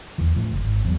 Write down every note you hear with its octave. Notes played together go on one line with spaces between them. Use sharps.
E2 E3
A2 F3
F#1
G#1
E2 F#3